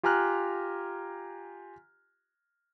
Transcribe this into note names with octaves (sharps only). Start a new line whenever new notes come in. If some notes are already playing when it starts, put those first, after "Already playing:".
F4 G4 G#5 A#5 F6 F#6